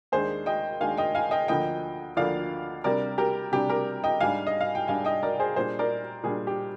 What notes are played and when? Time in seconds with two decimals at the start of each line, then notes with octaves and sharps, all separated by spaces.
0.12 D#2 D#3 G#3 D4 G#4 C5
0.46 D#5 G5
0.80 D#2 D#3 G#3 D4 F5 G#5
0.97 D#5 G5
1.15 F5 G#5
1.31 D#5 G5
1.48 D2 D3 F3 A#3 D#5 G5
2.16 D2 D3 F3 A#3 D5 F5
2.84 C3 G3 D4 A#4 D5
3.18 G4 A#4
3.52 C3 G3 D4 G4
3.70 G4 A#4
4.04 D#5 G5
4.20 G#2 G3 D4 F5 G#5
4.47 D#5
4.61 F5
4.75 G5
4.88 G#2 G3 D4 F5 G#5
5.05 D#5 G5
5.23 A#4 D5
5.40 G#4 C5
5.56 A#2 G3 D4 G#4 C5
5.79 A#4 D5
6.23 A#2 G3 D4 G#4
6.47 G4